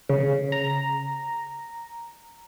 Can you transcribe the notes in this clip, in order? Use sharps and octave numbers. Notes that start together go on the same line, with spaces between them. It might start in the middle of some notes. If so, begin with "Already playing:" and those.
C#3
A#5